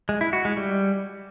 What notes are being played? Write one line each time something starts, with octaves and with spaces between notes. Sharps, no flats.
G#3
E4
F#4
G#3
G3